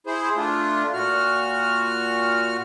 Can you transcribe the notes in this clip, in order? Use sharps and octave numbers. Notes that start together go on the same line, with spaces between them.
E4 G#4 C5
A3 D4 F4
A#2 F#4 F6